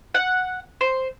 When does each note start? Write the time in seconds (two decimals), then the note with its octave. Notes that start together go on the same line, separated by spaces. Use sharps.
0.14 F#5
0.81 C5